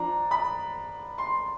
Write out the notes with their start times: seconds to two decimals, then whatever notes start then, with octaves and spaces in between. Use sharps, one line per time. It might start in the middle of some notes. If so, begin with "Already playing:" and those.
Already playing: F3 D4 A#5
0.31 B5
1.18 C6